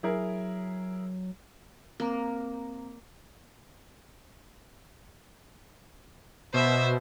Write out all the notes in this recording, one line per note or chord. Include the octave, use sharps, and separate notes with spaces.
F#3 E4 G#4 A#4
A#3 C4 A#5
B2 C5 E5